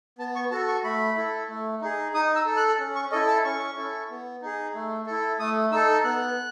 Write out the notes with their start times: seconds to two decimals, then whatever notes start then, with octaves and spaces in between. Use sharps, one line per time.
0.18 B3 A5
0.35 C#6
0.51 F#4 A4 A5
0.68 C#6
0.84 A3 B5
1.17 E4 A4
1.49 A3
1.81 D#4 G#4
2.14 D#4 D#6
2.36 E6
2.46 A4
2.57 F#6
2.79 C#4
2.96 C#6
3.12 E4 A4 D#5
3.28 A5
3.45 C#4 C#6
3.77 E4 A4
4.10 B3
4.42 D#4 G#4
4.75 A3
5.06 E4 A4
5.40 A3 D#6
5.71 D#4 A4 E6
6.04 B3 F#6